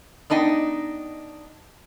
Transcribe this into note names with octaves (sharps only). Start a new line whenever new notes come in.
B3 D4 D#4 D#5 G5